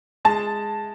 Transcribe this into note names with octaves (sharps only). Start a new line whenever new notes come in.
G#3 A5